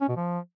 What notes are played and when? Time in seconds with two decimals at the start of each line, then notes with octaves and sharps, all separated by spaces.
0.01 C#4
0.09 B2
0.16 F3